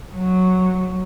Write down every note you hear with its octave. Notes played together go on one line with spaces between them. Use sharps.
F#3